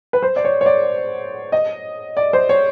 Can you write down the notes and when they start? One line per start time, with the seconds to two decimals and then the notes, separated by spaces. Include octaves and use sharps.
0.13 B4
0.22 C5
0.36 D5
0.45 C#5
0.61 C#5
0.66 D5
1.52 D#5
2.17 D5
2.33 C5
2.49 C#5